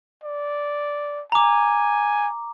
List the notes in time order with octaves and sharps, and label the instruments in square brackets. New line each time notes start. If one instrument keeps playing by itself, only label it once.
[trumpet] D5
[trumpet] G#5 [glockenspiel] A#5 D6